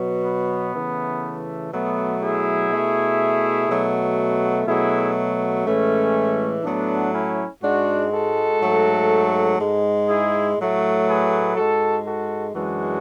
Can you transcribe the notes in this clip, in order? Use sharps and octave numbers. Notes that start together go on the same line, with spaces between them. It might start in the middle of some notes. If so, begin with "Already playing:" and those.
Already playing: B2 F#3
B3
C#3 E3 A3
B2 F#3 A3 B3
E4 G#4
B2 A3
B2 F#3 A3
B2 F#3 A3 E4 G#4
A2 E3 G#3 A3 C#4
A2 F#3 A3 B3 D4
C#4 E4
G#2 G#3 D4 F#4
F#4 A4
G#2 F#3 A3
G#2 G#3
E4 G#4
A2 F#3 A3
G#4 B4
G#2 G#3 F#4 A4
F#4 A4
F#2 E3 G#3 D4 F#4